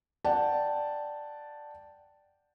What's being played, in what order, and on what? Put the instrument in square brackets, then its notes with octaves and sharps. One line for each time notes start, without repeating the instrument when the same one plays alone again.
[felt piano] D5 F#5 G5 A5